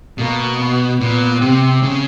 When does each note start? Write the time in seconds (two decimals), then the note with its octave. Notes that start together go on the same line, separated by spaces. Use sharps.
0.18 B2 A#3
0.59 B3
1.00 A#2 B3
1.41 C3 C4
1.83 C#3